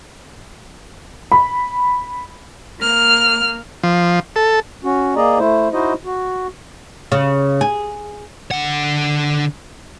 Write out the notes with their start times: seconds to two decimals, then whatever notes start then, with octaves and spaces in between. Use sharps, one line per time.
1.32 B5
2.79 A#3 F6
3.83 F3
4.36 A4
4.84 C#4 F#4
5.16 A#3 G#4 D5 D#5 A#5
5.39 A3 E4 C5
5.73 D#4 E4 F#4 C5 D#5
6.05 F#4
7.12 C#3
7.61 G#4
8.51 D3 F#5